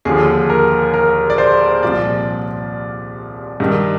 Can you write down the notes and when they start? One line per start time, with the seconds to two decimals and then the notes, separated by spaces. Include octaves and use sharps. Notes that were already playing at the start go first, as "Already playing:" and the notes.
0.05 D#2 D3 F3 G#4
0.50 A#4
0.94 A#4
1.30 D5
1.38 C5
1.83 C2 A#2 F3 D5
3.60 G2 D#3